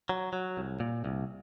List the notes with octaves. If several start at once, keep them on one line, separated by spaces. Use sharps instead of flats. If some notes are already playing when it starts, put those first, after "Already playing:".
F#3
F#3
C2
A#2
C2